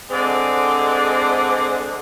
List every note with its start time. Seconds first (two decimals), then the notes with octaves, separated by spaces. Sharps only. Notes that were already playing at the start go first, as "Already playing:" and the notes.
0.10 D3 G#3 C4 D5